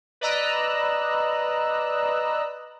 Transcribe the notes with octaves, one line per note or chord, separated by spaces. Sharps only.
B4 D5 D#5 A#5 E6 F#6